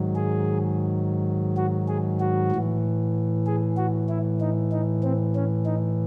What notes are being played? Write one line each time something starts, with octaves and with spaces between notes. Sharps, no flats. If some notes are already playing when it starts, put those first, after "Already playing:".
Already playing: G#2 D#3 F#3
G#4
F#4
G#4
F#4
A2 E3
G#4
F#4
E4
D#4
D#4
C4
C#4
D#4